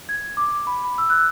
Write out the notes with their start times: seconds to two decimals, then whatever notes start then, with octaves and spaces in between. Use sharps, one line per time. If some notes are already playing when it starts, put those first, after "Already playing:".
0.09 G#6
0.37 D6
0.67 B5
0.98 E6
1.10 F#6